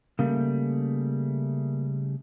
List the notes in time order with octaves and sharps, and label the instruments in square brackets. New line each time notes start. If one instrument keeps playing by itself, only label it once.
[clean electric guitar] C#3 G3 A3 [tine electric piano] A#3